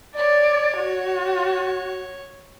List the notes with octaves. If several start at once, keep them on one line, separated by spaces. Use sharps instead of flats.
C#5 D5
F#4